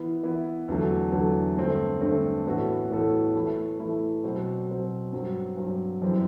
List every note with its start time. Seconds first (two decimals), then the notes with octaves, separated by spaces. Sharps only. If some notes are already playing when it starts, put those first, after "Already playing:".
Already playing: E3 B3 E4
0.23 E3 B3 E4
0.68 E2 D3 F#3 A3
1.12 E2 D3 F#3 A3
1.56 G2 D3 A3 C4
2.01 G2 D3 A3 C4
2.46 A2 E3 B3 F#4 A4
2.90 A2 E3 B3 F#4 A4
3.34 E3 A3 E4
3.79 E3 A3 E4
4.24 B2 F#3 C4
4.68 B2 F#3 C4
5.13 G2 F#3 C4
5.57 G2 F#3 C4
6.02 F#2 E3 G3 C4